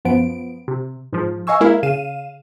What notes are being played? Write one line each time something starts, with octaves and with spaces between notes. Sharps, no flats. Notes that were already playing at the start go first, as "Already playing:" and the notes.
F#2 F3 B3 D7
C3
G#2 F3
D#5 F5 G#5 C#6 E6
G#3 A#3 E4 A#4 E5 F5
C#3 F5 D#7 E7